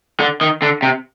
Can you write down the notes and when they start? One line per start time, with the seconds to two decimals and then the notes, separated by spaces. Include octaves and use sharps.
0.20 D3
0.41 D#3
0.62 D3
0.82 C3